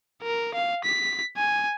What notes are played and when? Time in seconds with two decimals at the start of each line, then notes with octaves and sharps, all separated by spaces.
0.23 A#4
0.54 F5
0.84 B6
1.37 G#5